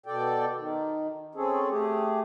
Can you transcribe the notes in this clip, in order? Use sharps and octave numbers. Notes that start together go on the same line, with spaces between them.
B2 A4 D5 G5
D#3
C4 C#4 G#4 A4
A3 G4 G#4